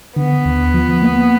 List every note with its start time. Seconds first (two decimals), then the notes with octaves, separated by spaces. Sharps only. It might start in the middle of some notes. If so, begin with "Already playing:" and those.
0.16 D3 B3
0.45 D#2
0.74 F3
1.02 A#3